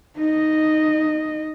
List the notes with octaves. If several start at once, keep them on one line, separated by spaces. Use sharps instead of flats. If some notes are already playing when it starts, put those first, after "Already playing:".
D#4 D#5